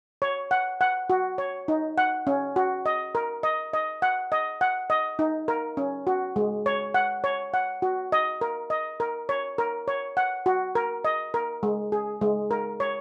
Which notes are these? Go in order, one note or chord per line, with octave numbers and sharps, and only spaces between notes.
C#5
F#5
F#5
F#4
C#5
D#4
F#5
C#4
F#4
D#5
A#4
D#5
D#5
F#5
D#5
F#5
D#5
D#4
A#4
C#4
F#4
G#3
C#5
F#5
C#5
F#5
F#4
D#5
A#4
D#5
A#4
C#5
A#4
C#5
F#5
F#4
A#4
D#5
A#4
G#3
G#4
G#3
A#4
C#5